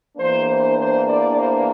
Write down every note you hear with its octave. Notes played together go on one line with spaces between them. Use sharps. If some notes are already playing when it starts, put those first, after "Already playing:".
E2 E3 A#3 D4 C5
C5
C5
D5
C5